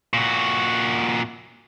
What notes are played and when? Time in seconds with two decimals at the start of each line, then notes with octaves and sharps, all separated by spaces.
0.14 A#2 F#4